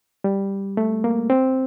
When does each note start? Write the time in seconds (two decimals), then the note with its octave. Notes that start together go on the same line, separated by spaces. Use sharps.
0.24 G3
0.77 A3
1.04 A#3
1.30 C4